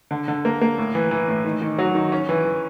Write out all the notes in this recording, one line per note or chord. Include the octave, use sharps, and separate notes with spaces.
D3
D3
A#3
A#3
A2
E3
E3
A2
D#3
D#3
F#3
D#3
C#4
E3
E3